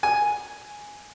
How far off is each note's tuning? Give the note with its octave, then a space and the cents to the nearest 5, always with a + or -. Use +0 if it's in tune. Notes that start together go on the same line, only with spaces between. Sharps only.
G#5 +0